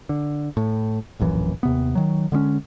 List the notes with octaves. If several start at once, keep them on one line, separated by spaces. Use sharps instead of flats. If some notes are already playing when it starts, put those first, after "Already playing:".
D3
A2
D1 A#1 F#2 E3
D#2 C3 B3
D#3 F#3
D3 G#3 B3 C#4